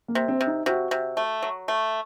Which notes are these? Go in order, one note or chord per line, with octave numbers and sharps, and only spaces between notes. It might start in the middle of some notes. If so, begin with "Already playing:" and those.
A#3
C3
C4
C3
D#4
C3 F#4
C3
A3
F#3
A3